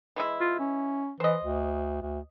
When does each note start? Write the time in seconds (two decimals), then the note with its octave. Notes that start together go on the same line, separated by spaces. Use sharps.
0.16 E3 G#3 E4
0.40 F4
0.59 C#4
1.20 E3 C5 D#5
1.44 D2
2.02 D2